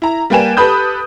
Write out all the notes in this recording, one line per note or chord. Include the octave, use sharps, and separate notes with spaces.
E4 A#5
G3 A#3 B4 G5 G#5 E7
G4 A4 B4 B5 D#6 G6